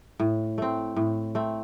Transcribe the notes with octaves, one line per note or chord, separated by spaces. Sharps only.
A2
A3 C4
A2
A3 C4